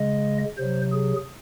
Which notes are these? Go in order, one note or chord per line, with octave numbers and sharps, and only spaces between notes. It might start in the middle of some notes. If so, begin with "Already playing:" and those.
Already playing: C#3 G#3 D#5
C3 F#3 C5
G#4